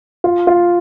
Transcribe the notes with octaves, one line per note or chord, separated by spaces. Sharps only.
F4
F4